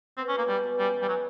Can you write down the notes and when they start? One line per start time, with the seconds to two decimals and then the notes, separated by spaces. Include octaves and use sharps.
0.17 B3 C4
0.28 C#4
0.33 B2 A#3
0.48 G3 G#3
0.64 B2
0.78 G3 C#4
0.94 E3
1.02 G3
1.08 F#3 G#3